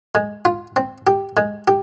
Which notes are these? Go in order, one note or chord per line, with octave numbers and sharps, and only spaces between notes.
G#3
F4
C4
G4
G#3
G4